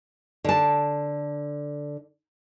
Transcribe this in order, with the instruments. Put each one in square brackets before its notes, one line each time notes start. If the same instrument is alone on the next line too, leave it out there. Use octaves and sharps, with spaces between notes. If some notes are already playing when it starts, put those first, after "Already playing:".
[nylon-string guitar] D3 A5